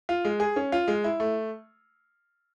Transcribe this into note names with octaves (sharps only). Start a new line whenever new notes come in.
F4
G#3
G#4
C#4
F4
G#3
E4
A3